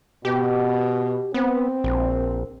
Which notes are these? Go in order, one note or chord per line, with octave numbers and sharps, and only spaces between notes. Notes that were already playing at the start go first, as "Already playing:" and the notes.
B2 G4
B3 C4
A#1